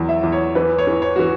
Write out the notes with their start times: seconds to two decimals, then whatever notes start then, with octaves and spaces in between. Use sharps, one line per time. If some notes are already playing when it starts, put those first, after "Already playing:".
Already playing: E2 F#3
0.09 E5
0.23 E2
0.32 C#5
0.55 E3 B4
0.78 C#5
0.87 E3
1.02 C#5
1.16 E3 F#4